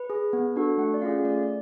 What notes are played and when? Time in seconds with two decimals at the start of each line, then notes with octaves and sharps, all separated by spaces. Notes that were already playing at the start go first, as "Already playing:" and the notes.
Already playing: B4
0.10 G#4
0.33 B3
0.56 D4 F#4 A4
0.78 A3 F#5
0.94 D5
1.02 C#4 F4 G#4 F5
1.24 A3 D5
1.43 D5